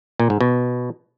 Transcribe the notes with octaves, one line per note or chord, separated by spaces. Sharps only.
A#2
G#2
B2